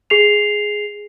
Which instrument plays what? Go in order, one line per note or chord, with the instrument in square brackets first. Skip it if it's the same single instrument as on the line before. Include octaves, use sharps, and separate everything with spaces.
[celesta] G#4 C7 F7